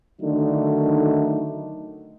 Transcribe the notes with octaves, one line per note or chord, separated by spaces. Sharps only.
D3 D#3 F#3 A3 D4 D#4